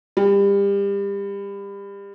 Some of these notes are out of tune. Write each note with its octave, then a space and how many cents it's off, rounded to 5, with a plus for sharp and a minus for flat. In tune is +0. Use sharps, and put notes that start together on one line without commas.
G3 +30